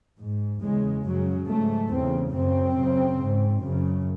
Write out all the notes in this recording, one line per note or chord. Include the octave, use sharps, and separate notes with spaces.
G#2
E2 C#3 G#3
F#2 C#3 F#3
G#2 A3
E2 C#3 C4
F#2 C#3 C4
F#2 C#3
G#2
F#2 C#3